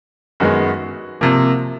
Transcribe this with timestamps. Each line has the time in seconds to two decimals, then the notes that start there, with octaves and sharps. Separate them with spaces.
0.40 F#2 D#3 G#3 B3 F#4
1.21 C3 F3 A#3